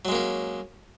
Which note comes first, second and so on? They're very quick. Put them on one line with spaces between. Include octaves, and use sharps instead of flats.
F#3 G#3 A#3 C#4